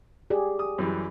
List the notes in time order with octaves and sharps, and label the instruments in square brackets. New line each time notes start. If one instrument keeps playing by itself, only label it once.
[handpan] G4 G#4 D5
[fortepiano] D#6
F#2 E3 G3